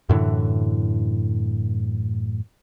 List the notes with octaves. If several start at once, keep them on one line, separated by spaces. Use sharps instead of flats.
F#2 A2 D3 E3